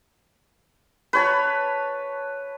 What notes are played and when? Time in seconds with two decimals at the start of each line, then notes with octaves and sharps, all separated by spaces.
1.13 B4 C#5 A5